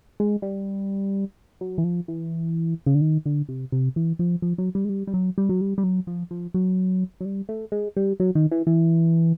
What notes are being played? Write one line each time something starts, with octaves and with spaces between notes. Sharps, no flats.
G#3
G3
F#3
E3
F3
E3
C#3
D3
D#3
D3
C3
C3
E3
F3
F3
F#3
G3
G#3
G3
G3
F#3
G3
F#3
G3
G3
F#3
F3
F3
F#3
F#3
G3
A3
G#3
G3
F#3
D#3
E3
E3